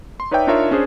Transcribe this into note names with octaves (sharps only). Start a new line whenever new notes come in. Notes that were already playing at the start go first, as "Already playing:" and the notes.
C6
D#4 B4 C#5 D5 E5 G5
D4 D#4 F4 A#4 C#5 E5
C#4 D4 G#4 C5